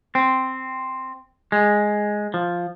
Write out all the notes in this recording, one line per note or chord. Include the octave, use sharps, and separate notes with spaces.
C4
G#3
F3